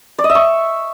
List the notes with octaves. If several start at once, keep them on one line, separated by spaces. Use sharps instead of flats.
D5
D#5
E5
C#6